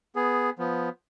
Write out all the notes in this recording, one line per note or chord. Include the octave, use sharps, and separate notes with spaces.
B3 G#4
F3 B3